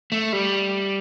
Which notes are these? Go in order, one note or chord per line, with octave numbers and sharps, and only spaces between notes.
A3
G3